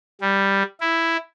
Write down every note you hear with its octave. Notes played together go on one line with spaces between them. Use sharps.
G3
E4